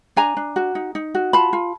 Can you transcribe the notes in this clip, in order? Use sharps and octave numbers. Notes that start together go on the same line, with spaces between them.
D4 G#5 A#5
D4
F#4
D#4
D#4
F#4
F4 A5 B5
F4